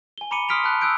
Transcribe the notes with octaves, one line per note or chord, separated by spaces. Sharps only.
G#5 G7
A#5 B5 D6 C#7 D#7 G7
C6 D#6 F6 B6 D7 F7
A5 B5 F#6
D#6 E6 F#6 G6 D7